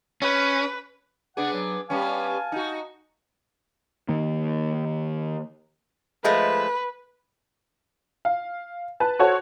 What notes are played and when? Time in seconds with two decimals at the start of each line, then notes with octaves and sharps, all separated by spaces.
0.22 C#4 B4
1.37 C#3 B3 D4 G#4 F#5
1.52 F#3
1.90 G3 B3 C#4 F5 G#5 A5
2.52 D#4 F#4
4.09 D#3 A#3
6.24 F3 G#3 A3 B4
8.25 F5
9.00 B4 A5
9.19 F#4 A4 C5 C#5